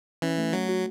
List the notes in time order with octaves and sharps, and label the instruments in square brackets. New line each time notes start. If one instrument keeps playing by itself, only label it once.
[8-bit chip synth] E3 [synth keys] C#4
[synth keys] A3
[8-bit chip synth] F#3 [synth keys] A3
[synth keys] F#4